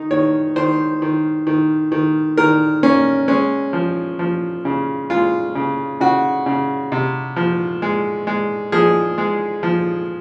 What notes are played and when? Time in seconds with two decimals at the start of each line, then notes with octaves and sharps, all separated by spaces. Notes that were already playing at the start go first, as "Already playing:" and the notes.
Already playing: D#3 D#4
0.11 D#3 C#5
0.56 D#3 C5
1.02 D#3
1.47 D#3
1.92 D#3
2.37 D#3 A#4
2.83 A#3 C#4
3.28 G#3 C#4
3.73 F3
4.19 F3
4.65 C#3
5.10 G#3 F4
5.55 C#3
6.00 C#3 F#4
6.46 C#3
6.92 C3
7.36 F3
7.82 G#3
8.27 G#3
8.72 F3 G#4
9.18 G#3
9.63 F3